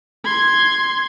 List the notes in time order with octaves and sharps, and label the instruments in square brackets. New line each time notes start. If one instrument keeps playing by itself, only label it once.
[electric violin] C6 G#6